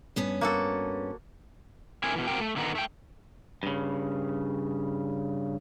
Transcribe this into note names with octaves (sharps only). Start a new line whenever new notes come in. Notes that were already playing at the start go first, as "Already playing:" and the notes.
G2 B3 C#4
A#3 F#4 A4
A3 C4 D4 E4 A#4 G#5
B2 E3
C4 D4 F#4 G4 A#4 G5
A3
D3 D#3 B3 D#4
A3 G5
G2 C#3